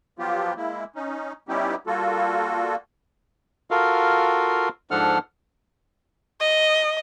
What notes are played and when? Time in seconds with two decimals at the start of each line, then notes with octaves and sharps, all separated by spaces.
0.19 F3 F#3 B3 F4 G4
0.57 G#3 A#3 E4
0.95 C#4 D#4
1.48 G3 B3 C#4 D#4 E4 G4
1.87 G3 A#3 F4 F#4 A4
3.71 F4 F#4 A4 A#4 F5
4.91 G#2 F3 D4 A4 F#5 F6
6.40 D#5